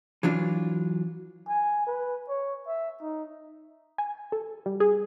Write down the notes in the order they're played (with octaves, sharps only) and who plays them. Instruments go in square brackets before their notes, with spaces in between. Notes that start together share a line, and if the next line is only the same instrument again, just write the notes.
[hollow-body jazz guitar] E3 F#3 D4 F4
[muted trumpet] G#5
B4
C#5
E5
D#4
[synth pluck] G#5
A4
G3
G#4